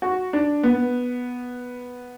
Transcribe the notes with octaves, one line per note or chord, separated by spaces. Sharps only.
F#4
D4
B3